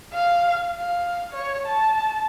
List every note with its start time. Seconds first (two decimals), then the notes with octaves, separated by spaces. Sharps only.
0.14 F5
0.77 F5
1.33 C#5
1.67 A5